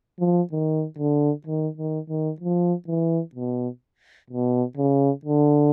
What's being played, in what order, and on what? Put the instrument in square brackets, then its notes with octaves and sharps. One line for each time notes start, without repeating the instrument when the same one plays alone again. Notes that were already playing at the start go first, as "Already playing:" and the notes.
[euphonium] F3
D#3
D3
D#3
D#3
D#3
F3
E3
B2
B2
C#3
D3